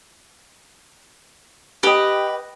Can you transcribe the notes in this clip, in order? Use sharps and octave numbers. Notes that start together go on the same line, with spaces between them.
G4 B4 D#5